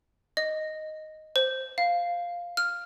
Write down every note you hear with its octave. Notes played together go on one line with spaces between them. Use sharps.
D#5
C5
F5
F6